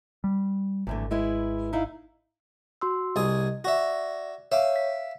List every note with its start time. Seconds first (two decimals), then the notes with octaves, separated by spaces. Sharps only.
0.24 G3
0.87 G#1 E2 A2 D3
1.11 G#3 E4 B4
1.73 D#4 E4 F5
2.81 F#4 C6 E6
3.16 C2 G#4 D#5 G#5
3.64 F#4 D5 E5 A#6
4.52 C#5 E5 F5 D6
4.76 B6